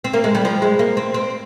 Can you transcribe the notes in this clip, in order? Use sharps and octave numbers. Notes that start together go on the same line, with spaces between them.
C4
A#3
G#3
G3
F3
G#3
A#3
C4
C4